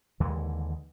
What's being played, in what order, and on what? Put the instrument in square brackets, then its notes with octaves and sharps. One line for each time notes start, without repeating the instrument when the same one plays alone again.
[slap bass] D#2 D3 E3 G#3